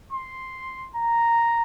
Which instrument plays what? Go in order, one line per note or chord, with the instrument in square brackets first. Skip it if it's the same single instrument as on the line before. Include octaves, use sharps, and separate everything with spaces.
[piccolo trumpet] C6
A#5